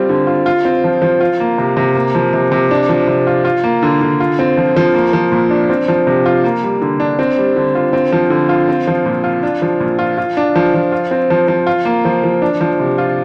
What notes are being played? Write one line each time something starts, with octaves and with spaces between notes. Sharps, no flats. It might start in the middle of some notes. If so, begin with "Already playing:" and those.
Already playing: G3 C4 F4
D3
F4
F4
C4
F3
F3
F4
A#3
C3
C3
A#3
F3
C3
C3
D4
F3
C3
F4
F4
A#3
D3
D3
F4
C4
F3
F3
A#3
F3
A#2
D4
C4
F3
C3
F4
A#3
G3
D3
D4
C4
G3
D3
F4
C4
F3
D3
F4
C4
F3
A#2
F4
D4
F3
A#2
F4
F4
D4
F3
F3
F4
C4
F3
F3
F4
A#3
F3
F3
D4
F3
C3
F4